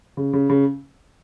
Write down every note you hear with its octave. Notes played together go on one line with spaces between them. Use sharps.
C#3
C#3
C#3